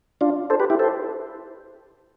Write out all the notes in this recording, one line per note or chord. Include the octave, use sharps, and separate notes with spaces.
D4 F4
A4 C5
G4 B4
E4 G4
A4 C5